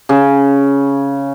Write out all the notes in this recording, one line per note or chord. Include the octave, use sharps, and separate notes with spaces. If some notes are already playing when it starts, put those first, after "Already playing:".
C#3